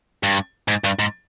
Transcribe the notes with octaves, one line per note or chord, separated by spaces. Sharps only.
G2
G#2
G2
G#2